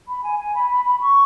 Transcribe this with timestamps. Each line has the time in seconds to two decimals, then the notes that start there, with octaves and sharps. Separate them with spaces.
0.08 B5
0.24 G#5
0.39 G#5
0.55 B5
0.71 B5
0.86 B5
1.01 C#6